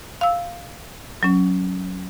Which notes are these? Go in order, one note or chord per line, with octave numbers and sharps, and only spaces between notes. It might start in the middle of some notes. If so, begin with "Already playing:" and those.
F5 E6
F#3 C#4